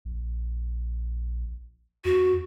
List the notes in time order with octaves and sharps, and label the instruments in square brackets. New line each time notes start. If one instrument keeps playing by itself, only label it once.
[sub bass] A#1
[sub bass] F2 [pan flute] F#4